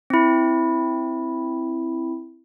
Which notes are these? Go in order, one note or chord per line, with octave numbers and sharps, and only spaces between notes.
C4 E4